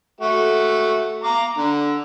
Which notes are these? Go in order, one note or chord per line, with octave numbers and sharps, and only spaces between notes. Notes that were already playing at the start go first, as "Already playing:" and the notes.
A3 F#4
A#5 D6
D3